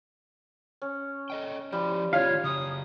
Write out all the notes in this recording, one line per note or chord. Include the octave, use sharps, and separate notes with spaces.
C#4
A4 D#5 G5
F3 G3 E4 C5
A2 D#3 F4 C#5 F5
C#3 F#4 D#6